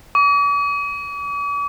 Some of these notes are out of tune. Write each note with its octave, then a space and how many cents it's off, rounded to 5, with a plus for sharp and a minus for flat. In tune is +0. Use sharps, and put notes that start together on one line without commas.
D6 -45